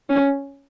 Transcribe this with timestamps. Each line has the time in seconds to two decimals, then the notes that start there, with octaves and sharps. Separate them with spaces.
0.09 C#4